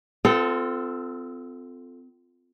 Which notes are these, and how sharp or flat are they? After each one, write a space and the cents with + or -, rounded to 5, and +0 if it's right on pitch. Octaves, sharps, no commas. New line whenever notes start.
C4 -30 F4 +0 A4 +0